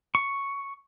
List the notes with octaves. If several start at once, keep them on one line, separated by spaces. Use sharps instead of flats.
C#6